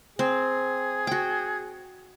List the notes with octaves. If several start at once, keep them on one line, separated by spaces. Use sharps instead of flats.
C4 G#4
F#4 G5